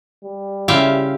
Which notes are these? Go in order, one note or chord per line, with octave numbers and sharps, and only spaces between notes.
G3
C#3 E4 F4 G4 E5 F5